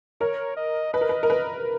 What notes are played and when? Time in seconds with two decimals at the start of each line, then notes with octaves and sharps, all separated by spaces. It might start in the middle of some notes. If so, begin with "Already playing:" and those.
0.21 A#4 C#5
0.57 D#5
0.93 B4 D#5
1.01 A#4
1.09 B4
1.23 A#4
1.30 B4